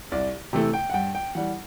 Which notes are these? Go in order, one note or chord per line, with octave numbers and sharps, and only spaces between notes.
C2 D5
C3 E3 A3 G5
G5
F#5
G2 G5
G5
E3 G3 F#5